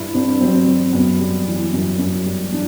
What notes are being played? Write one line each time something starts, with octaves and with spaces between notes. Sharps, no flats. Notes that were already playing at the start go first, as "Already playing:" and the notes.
Already playing: G2 E4
G2 C4
F#3 C4
F#3
F#2 B3
G3
E3
F#2
F#2
G3
E3 D4